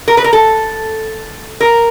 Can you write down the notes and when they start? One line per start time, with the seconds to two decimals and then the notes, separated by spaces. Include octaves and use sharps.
0.08 A#4
0.17 B4
0.24 A#4
0.33 A4
1.61 A#4